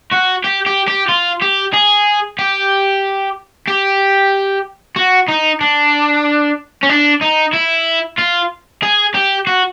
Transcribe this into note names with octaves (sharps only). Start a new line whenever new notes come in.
F#4
G4
G4
G4
F4
G4
G#4
G4
G4
F#4
D#4
D4
C#4
D4
D#4
E4
F4
G#4
G4
F#4